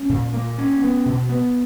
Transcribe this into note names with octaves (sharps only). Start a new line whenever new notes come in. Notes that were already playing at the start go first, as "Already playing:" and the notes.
Already playing: C#4
A#2
A#3
C#4
B3
B2
B3